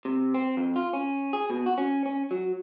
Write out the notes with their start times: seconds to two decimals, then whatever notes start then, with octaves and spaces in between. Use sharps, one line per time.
0.05 C3
0.34 C4
0.57 F2
0.76 F4
0.93 C#4
1.33 G#4
1.50 B2
1.66 F#4
1.78 C#4
2.06 C#4
2.31 F#3